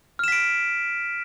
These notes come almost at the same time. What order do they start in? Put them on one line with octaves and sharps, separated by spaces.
F6 E7 B6 D7